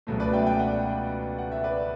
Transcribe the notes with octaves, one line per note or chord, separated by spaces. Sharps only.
C#2 B2 F#3 A3
B4 D5
E5 G5
E5 G5
D5 F#5
F#5
E5
B4 D5